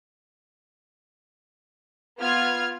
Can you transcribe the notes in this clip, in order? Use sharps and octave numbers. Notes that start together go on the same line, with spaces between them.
B3 F4 F6 G#6